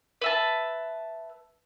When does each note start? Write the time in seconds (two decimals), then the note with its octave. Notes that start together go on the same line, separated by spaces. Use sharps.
0.21 B4 E5 A5